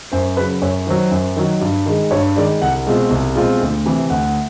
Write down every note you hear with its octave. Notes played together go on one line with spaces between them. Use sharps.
F#2 C5
C#3 F#3 B4
F#2 C#5
D#3 F#3 C5
F#2
D#3 F#3
G2
D#3 G#3
G2 C#5
D#3 G#3 D5
C2 F#5
B2 G#3 C4 F4
C2
B2 G#3 C4 F4
D2
C3 E3
D2 F#5